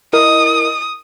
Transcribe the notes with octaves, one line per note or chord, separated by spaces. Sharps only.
E4 A#4 D#5 D#6